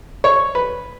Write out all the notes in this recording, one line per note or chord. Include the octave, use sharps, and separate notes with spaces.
C#5
B4